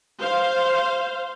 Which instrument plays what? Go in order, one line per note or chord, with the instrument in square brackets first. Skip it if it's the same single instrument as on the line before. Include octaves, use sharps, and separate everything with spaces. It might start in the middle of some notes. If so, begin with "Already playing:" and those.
[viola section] C5 F5